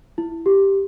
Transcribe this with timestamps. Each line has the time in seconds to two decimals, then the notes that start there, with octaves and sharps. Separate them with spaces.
0.18 E4
0.46 G4